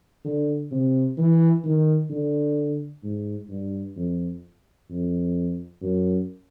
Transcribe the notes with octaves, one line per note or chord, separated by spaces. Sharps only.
D3
C3
E3
D#3
D3
G#2
G2
F2
F2
F#2